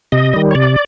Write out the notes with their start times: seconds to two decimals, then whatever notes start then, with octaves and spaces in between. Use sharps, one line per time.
0.12 C3 D#5
0.33 D#3 G3
0.51 C#5
0.55 C3 D5